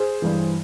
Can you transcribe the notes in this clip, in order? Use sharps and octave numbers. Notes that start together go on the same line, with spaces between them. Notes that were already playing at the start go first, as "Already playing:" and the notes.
Already playing: G#4 C5
G2 E3